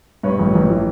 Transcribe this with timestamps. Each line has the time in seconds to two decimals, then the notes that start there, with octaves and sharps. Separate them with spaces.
0.23 G2 B4 C#5
0.39 A1
0.55 A1
0.70 E3